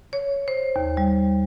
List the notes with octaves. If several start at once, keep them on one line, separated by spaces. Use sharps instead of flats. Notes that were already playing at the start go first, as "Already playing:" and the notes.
C#5
C5
D#2
G3